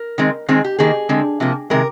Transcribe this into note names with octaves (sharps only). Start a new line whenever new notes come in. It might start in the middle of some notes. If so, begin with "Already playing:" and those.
Already playing: A#4
D#3 G#3 C4
D#3 G#3 C4 G#4
G4
D#3 A#3 G#4
D3 G#3 C4
C3 F3 A#3
C3 D#3 G#3 A#4